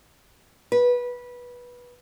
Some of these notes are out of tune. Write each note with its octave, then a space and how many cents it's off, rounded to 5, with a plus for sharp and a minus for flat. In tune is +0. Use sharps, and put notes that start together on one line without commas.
B4 -15